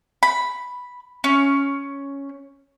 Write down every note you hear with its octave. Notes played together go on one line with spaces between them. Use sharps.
B5
C#4